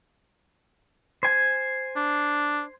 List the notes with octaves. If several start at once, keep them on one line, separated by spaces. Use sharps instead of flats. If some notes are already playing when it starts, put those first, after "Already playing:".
C5 G#5
D4